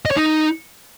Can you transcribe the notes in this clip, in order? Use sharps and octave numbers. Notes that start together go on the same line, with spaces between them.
D#5
C#5
D#4